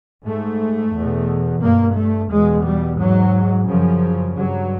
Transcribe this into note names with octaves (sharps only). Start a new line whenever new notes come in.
G#2 A3
E2 B2
G2 A#3
A3
E2 B2 G#3
G3
G#2 F#3
F#2 C#3 F3
G2 F#3